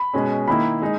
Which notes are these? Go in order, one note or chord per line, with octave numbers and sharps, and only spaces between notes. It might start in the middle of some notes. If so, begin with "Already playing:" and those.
Already playing: B5
B2 G#3 C#4
D#3 A#3 E4 B5
G#3 D#4